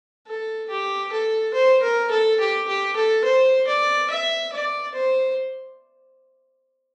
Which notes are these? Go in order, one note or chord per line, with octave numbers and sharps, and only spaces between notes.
A4
G4
A4
C5
A#4
A4
G4
G4
A4
C5
D5
E5
D5
C5